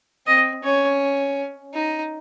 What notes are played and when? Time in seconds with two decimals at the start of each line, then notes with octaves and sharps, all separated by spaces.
0.27 C4 D#5
0.64 C#4 C#5
1.75 D#4